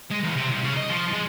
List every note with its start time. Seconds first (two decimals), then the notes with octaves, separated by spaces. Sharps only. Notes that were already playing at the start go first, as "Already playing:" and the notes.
0.11 G#3
0.24 E2
0.37 C3
0.51 C2
0.64 C#3
0.77 D#5
0.90 F3
1.13 G#3